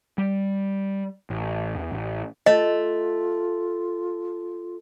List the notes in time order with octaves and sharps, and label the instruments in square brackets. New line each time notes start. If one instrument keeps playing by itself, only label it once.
[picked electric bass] G3
A1
E2
A1
[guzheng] A3 [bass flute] F4 [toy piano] D#5